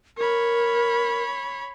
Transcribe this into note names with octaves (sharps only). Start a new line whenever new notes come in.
A#4 C#5 B5